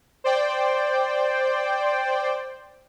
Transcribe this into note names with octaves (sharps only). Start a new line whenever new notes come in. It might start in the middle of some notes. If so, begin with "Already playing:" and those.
C5 D5 G5